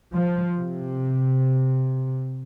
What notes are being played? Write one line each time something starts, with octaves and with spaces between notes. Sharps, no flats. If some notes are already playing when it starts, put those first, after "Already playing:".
F3
C3